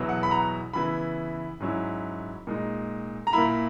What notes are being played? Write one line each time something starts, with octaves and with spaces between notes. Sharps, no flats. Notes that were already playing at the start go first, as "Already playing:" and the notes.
Already playing: E2 B2 F#3 B3 E4
F#5
B5
A#5
C#3 E3 B3 E4 B5
G#2 F#3 C#4 E4
A#2 G#3 D#4
A#5
A#2 A#3 E4 B5